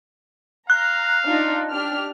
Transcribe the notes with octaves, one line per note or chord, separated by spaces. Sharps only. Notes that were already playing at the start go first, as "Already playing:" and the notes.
F5 A#5 F#6
D4 D#4 F4
D4 G4 F6